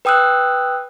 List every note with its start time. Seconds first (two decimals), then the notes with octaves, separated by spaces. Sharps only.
0.05 B4 G5 D#6 E6 F#6